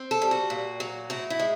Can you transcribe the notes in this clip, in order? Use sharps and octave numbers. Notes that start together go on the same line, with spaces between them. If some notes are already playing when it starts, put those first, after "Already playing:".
Already playing: C4
A4
G3
F#4
A#2
F#3
A2 F#4
E4
G#3